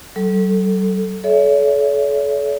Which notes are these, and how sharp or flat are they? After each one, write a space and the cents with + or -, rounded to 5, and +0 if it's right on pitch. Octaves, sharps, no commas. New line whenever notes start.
F#3 +45 A4 +0
A4 -35 C#5 +45 E5 +0